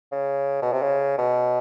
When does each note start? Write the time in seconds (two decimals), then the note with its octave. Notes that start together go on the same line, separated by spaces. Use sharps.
0.12 C#3
0.62 B2
0.72 C3
0.82 C#3
1.18 B2